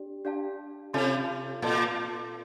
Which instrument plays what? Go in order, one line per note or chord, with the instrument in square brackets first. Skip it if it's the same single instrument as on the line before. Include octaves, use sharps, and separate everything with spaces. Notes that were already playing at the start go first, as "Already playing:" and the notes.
Already playing: [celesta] D4 G4 D5
D4 G4 D5 F5 A5
[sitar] C3 [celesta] F4 A4 D5 A5 C6
[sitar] A#2 [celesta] F4 A4 D5 A5 C6